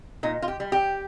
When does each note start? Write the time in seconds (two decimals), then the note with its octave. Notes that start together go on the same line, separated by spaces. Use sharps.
0.23 A#2 D#4
0.42 F4
0.48 G4
0.60 G3
0.72 G4